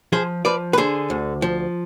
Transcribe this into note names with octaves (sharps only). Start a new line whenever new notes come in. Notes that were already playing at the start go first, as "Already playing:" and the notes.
F3 G#4 C5
F3 B4 D5
B4
D3 G#4 C5
D2
F3